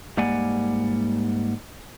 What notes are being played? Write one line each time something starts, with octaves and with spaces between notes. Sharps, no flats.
G#2 G3 A#3 D5 F#5 G#5